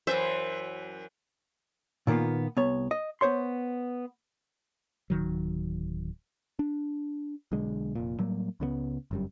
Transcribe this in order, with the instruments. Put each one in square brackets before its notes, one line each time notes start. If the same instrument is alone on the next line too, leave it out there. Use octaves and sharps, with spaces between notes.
[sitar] F#2 E3 E5 [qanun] C5
[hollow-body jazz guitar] A#2 D#3 A#3 B3 F4
C2 B3 C#5
D#5
B3 C5 C#5 C6
[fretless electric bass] D1 D#3 F#3
[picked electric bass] D4
B1 D3 G#3
F1 A#2
A2 F#3 G3 A#3
C#2 C#3 G#3 B3
G1 F#2 G3